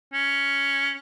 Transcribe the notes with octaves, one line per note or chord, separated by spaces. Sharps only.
C#4